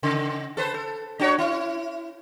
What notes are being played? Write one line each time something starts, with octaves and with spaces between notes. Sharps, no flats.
C#3
A4 B4 C5
A4
D4 F#4 C#5
E4